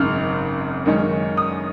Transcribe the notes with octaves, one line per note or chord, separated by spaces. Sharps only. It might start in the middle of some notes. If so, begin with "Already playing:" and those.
Already playing: G#1 F#2 C#3 F6
F#2 D#3 G#3 C#4
D#6